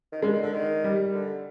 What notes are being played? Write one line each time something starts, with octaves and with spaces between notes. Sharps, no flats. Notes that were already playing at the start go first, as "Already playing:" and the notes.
D#3
D3 G#3
D#3
D3
D#3
G3
D3